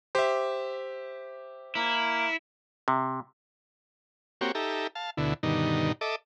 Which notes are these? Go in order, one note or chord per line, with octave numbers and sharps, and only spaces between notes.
G4 C5 E5
A#3 E4
C3
A#3 C4 F#4 G4 C#5
D#4 G4 A4 E5 A#5
F5 A5
D2 B2 D3 E4
G2 B2 D3 D#3 D#4
A4 D#5 E5 D6